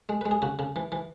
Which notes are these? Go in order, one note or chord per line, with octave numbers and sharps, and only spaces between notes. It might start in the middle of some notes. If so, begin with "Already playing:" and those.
G#3
G#3 B4
G#4
C#3 F#4
C#3
E3
E3